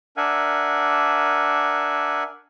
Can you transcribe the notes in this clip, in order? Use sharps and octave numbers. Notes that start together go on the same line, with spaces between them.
D4 A#4 E5 F#5 G#5